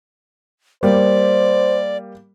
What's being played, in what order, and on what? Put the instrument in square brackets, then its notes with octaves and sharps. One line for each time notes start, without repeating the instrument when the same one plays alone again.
[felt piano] G3 A#3 [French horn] C5 [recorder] D5